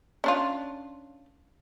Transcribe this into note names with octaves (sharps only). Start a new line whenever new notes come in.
C#4 D4 F4